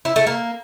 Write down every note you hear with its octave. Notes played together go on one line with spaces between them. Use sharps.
E4
A3
A#3